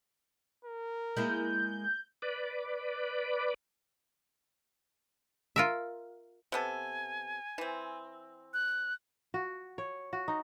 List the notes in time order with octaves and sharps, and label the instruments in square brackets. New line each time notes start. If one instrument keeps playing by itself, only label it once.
[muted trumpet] A#4
[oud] G#3 A#3 E4 [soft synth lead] G6
[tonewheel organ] B4 D5
[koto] F4 A#4 E5
[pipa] C3 B3 A4 [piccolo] G#5
[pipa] E3 C4
[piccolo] F#6
[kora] F#4
C#5
F#4
D#4